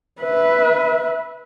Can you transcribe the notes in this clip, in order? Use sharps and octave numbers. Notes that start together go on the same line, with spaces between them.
B4 E5